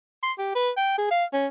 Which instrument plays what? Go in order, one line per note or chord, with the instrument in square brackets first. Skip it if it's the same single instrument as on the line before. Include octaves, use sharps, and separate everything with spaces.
[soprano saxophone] C6
G4
B4
G5
G#4
F5
C#4